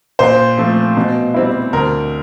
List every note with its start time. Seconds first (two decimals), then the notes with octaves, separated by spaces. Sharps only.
0.19 A#2 C5
0.57 F3 A3 C4
0.97 B2
1.34 G3 C4 E4
1.73 D2 A#4